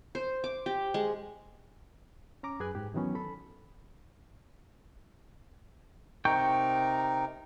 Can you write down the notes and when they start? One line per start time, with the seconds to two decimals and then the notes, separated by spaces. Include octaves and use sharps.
0.15 C5
0.44 D6
0.66 G4
0.94 G#3
2.43 C#4 A#5 D6
2.60 F#2 G#4 B4 G#5 F#6
2.75 G#2 G4
2.94 D#3 E3 F#3 B3 C#4
3.15 A4 B5
6.25 C3 D#4 A#4 G5 C#6 G6